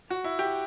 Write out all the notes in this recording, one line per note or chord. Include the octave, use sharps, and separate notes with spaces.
F#4
E4
G4